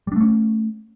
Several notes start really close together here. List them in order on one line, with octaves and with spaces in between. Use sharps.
G3 D4 A3 C#4